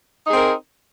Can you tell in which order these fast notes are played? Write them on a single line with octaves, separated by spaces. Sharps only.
D#4 G#4 C4 A#4